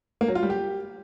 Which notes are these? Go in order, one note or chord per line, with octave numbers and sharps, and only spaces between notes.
A#3
F#3
F4
G3
G4